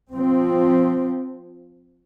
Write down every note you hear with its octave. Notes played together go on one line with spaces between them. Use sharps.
F3 C4